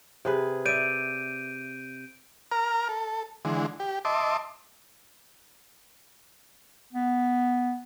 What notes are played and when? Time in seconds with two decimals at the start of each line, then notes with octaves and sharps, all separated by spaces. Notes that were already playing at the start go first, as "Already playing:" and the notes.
0.25 C3 G#4 B4
0.65 D5 E5 G6 D7 D#7
2.52 A#4 A#5 F6
2.89 A4
3.45 D3 E3 G#3
3.80 G4
4.05 D#5 E5 A5 C6 D6
6.93 B3